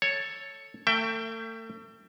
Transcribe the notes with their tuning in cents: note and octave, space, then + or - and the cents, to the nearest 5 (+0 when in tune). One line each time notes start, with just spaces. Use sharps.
A4 +0 C#5 +0
A3 +40 E5 +20 G5 +0